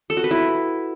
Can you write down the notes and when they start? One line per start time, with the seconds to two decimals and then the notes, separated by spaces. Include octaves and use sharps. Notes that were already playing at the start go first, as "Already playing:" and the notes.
0.10 A4
0.17 F#4
0.24 B4
0.31 E4